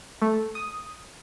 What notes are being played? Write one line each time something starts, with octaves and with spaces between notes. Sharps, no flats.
A3
D#6